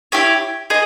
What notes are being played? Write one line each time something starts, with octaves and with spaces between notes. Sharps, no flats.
E4 G4 C#5
G#4 D#5